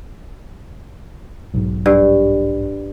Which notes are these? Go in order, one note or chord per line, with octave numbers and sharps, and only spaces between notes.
B1 G#2
G2